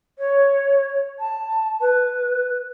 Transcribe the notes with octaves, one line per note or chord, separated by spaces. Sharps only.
C#5
A5
B4